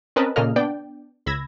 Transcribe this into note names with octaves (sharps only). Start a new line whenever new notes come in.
C4 C#4 A#4 B4 D#5 A5
A#2 C#3 A#3 A4 D#5 F6
B3 D4 D5 G5
C#2 B5 E6 G#6 A#6